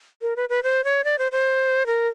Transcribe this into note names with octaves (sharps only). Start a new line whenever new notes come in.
A#4
B4
B4
C5
C#5
D5
C5
C5
A#4